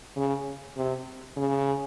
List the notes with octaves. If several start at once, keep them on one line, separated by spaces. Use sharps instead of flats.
C#3
C3
C#3